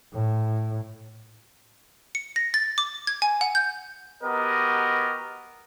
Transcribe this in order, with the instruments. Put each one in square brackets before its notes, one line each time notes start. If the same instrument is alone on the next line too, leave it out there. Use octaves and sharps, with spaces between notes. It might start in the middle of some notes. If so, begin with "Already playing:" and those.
[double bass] A2
[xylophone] C#7
A#6
A6
D6
G#6
G#5
F#5
G6
[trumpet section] B3 F#4 G4 A#4 D#5